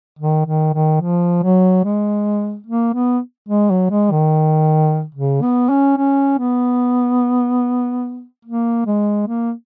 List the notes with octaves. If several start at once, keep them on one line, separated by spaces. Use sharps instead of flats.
D#3
D#3
D#3
F3
F#3
G#3
A#3
B3
G#3
F#3
G#3
D#3
C#3
B3
C#4
C#4
B3
A#3
G#3
A#3